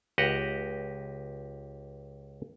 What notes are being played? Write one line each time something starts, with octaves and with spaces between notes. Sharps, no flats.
C#2 G4 D#5 F#5